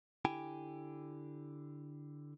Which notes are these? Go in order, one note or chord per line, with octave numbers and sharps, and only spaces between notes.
D3 E4 G4 G5 G#5